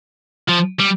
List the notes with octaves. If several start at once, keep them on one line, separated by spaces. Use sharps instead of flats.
F3
G3